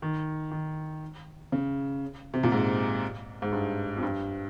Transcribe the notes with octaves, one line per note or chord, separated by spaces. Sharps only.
D#3
D#3
C#3
C3
A#2
G#2
G#2
G2
F2
G2